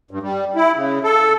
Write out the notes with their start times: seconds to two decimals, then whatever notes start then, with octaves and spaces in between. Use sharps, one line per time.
0.11 G2
0.23 G3
0.56 E4
0.76 C#3
1.04 A4